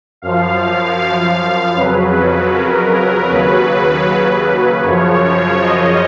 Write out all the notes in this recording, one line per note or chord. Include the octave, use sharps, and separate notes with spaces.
F#2 F3 F5
F5
F2 C#3 F#3 B4
A#4
D#2 C#3 F#3 B4
F#2 C#3 F3 C#5
D#5